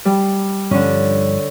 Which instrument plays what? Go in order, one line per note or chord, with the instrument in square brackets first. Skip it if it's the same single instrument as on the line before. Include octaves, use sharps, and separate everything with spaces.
[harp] G3
[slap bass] G2 F3 [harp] D3 C#4